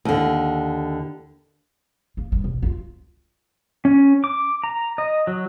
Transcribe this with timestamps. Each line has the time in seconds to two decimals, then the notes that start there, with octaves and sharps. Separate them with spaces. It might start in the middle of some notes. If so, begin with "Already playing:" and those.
0.05 D#2 D3
2.17 A#3
2.32 G2 D#3
2.44 B1
2.62 D#4 F4
3.85 C#4
4.24 D6
4.64 A#5
4.98 D#5
5.27 F#3